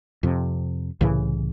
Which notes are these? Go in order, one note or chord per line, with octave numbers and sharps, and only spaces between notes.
F2 C3
C2 A2 C#3 E3